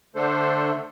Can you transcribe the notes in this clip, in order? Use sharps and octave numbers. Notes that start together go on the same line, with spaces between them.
D3 A3 D4 A4 C5